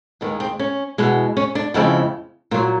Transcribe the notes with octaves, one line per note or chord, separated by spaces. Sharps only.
D#2 D#3 G#3 B3
C4
C#4
E2 B2 G#3
C#4
D4
F2 C#3 F3 G#3 E4
A#2 F#3 F4